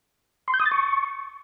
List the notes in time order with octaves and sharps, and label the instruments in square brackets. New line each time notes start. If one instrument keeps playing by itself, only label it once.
[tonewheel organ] C6
G6
D#6
A6
C#6